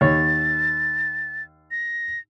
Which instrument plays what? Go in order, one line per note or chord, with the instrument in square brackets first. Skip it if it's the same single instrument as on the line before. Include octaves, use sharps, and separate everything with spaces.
[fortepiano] D#2 C#5 [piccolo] A6
[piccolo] A#6